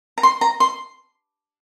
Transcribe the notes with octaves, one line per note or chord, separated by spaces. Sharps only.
A#5
C6
A#5
C6